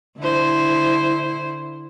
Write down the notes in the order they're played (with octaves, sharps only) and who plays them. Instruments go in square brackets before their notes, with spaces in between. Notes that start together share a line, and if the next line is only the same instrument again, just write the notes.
[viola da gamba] D3 E4 C5